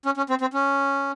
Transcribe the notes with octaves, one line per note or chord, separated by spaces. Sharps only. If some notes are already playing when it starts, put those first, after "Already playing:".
C#4
C#4
C4
C4
C#4